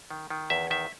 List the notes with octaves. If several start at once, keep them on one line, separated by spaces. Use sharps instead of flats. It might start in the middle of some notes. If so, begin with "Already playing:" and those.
D#3
D#3
E2 E5
D#3 E5